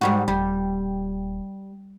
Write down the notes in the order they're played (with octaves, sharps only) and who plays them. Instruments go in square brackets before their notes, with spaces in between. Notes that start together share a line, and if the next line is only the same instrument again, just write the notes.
[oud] G#2 G3 F#4
[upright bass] D#1 [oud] G3